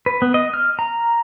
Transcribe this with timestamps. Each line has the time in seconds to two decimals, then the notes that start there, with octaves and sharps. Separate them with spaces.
0.06 B4
0.22 B3
0.34 D#5
0.54 F6
0.79 A#5